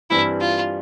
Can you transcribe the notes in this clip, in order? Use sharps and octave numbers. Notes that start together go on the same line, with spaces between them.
G2 E3 G3 C4 E4
F4